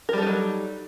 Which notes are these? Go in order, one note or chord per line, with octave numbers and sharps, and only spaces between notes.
F#3 G3 D#4 A4 A#4